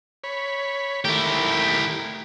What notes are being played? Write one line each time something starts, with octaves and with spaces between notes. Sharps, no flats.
C#5 B5
D#3 A3 E4 G4 A#4